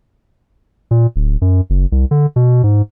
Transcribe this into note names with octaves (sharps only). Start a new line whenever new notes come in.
A#2
D1
F#2
F#1
C2
D3
B2
G#2